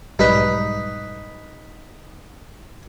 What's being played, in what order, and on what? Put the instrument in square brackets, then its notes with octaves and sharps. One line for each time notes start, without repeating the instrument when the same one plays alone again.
[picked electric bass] B1 G#2 G3 [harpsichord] D#4 B4